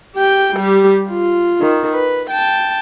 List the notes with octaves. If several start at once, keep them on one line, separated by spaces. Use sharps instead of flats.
G4 G5
G3 G4
F4
D#3
B4
G5 A5